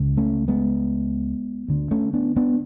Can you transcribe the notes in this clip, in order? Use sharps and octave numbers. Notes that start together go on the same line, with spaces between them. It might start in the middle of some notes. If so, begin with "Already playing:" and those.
Already playing: C#2 C#3
A3 C#4
G#3 B3
D2 D3
A3 C#4
B3 D4
B3 D4